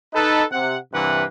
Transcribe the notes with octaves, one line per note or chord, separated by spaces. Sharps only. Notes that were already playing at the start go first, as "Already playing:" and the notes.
D#4 A4 B4
C3 F#5
G2 C3 E3 A#3 B4 F#5